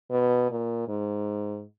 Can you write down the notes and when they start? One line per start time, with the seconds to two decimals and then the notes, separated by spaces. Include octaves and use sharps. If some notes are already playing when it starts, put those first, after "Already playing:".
0.11 B2
0.50 A#2
0.88 G#2